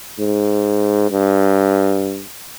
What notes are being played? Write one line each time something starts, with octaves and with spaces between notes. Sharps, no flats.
G#2
G2